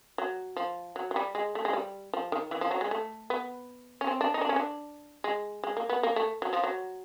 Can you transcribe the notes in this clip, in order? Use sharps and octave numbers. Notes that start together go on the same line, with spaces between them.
F#3
F3
F#3
F#3
G3
G#3
A3
G#3
G3
F3
D#3
E3
F3
F#3
G#3
A3
B3
C#4
C4
D4
D#4
D4
C#4
D4
G#3
G#3
A#3
B3
A#3
A3
F#3
F3
F#3